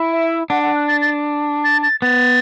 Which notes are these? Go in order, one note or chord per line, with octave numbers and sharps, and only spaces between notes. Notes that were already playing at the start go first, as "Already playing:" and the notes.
Already playing: E4
E5
D4 F#5
F#5
F#6
A6
A6
A6
A6
B3 A6